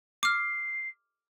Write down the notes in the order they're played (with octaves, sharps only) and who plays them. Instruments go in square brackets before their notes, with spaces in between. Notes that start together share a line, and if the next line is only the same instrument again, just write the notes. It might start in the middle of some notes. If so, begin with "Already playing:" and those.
[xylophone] D6 F6 [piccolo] C7